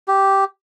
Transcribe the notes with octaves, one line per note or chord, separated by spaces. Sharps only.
G4